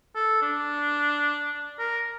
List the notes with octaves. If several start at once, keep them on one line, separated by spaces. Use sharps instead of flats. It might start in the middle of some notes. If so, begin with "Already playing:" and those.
A4
D4
A#4